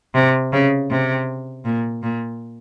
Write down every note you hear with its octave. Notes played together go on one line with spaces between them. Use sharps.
C3
C#3
C3
A#2
A#2